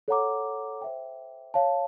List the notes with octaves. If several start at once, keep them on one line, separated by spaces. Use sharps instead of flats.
A4 C#5 F#5 A#5 D6
C5 E5 G5
C#5 F5 A5